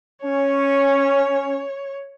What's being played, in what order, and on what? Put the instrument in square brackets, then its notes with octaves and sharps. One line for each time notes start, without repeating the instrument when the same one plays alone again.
[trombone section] C#4 [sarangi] C#5